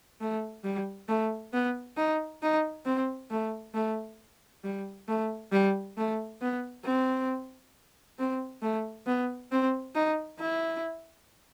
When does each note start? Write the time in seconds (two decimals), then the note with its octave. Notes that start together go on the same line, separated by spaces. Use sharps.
0.21 A3
0.64 G3
1.08 A3
1.53 B3
1.97 D#4
2.42 D#4
2.86 C4
3.31 A3
3.74 A3
4.64 G3
5.09 A3
5.53 G3
5.97 A3
6.42 B3
6.85 C4
8.19 C4
8.62 A3
9.07 B3
9.52 C4
9.95 D#4
10.40 E4